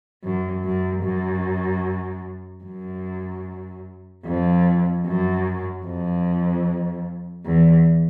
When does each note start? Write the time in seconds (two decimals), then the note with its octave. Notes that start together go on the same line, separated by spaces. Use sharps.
0.24 F#2
0.64 F#2
1.04 F#2
2.64 F#2
4.25 F2
5.05 F#2
5.85 F2
7.46 E2